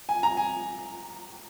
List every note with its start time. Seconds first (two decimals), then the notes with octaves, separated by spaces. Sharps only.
0.09 G#5
0.23 A#5
0.37 G#5